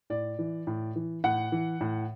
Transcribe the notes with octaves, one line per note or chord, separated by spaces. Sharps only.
A2 D5
E3
A2
E3
A2 F#5
E3
A2